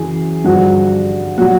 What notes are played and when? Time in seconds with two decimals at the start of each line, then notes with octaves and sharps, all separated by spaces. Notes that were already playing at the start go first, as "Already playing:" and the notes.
Already playing: F#2 C#3 E3 G#4
0.44 G2 D3 F3 F#4
1.38 A#2 F#3 F#4